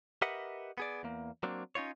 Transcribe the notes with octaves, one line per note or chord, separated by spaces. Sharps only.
G4 A#4 B4 D#5 E5 F#5
B3 G#4 D5
E2 A#3
F#3 A#3 C4 D4
C#4 D#4 F4 C#5